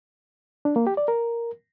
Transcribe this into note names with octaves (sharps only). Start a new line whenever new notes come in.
D4
A#3
G4
D5
A#4